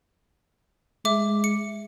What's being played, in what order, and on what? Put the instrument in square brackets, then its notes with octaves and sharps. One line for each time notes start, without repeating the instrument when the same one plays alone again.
[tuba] G#3 [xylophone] E5 D6
[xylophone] C#7